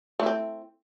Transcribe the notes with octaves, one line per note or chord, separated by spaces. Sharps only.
A3 C4 E4